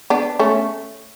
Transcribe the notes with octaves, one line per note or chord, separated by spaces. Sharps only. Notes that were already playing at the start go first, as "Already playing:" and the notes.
B3 D4
A3 C#4